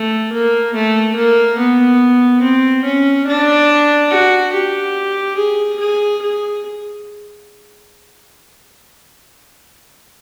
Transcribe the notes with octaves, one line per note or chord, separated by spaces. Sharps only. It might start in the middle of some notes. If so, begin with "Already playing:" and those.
Already playing: A3
A#3
A3
A#3
B3
C4
C#4
D4
F#4
G4
G#4
G#4
G#4